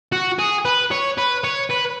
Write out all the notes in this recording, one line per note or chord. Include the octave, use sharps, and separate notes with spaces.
F#4
G#4
B4
C#5
B4
C#5
B4